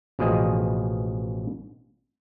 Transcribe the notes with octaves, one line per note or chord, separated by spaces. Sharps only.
A1 B2 F3 G#4 D#5